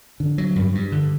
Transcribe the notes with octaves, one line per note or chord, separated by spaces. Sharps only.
D3
F#3
G2
G2
D3